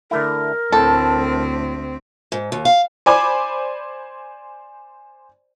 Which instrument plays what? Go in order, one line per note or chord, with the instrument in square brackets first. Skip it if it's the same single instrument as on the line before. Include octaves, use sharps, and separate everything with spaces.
[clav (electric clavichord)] D3 A3 E4 [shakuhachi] A#4
[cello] D2 C4 [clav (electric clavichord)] A2 [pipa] A4
[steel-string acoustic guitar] G#2
D#2
F5
[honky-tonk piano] C5 D5 G#5 B5 D6